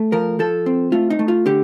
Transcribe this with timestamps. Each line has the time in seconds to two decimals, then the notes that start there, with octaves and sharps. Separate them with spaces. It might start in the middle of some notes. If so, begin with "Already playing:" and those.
Already playing: A3
0.12 F3 A#4
0.39 F3 A4
0.66 C4
0.92 A3 F4
1.10 D#4
1.19 A3
1.28 F4
1.46 D3 G4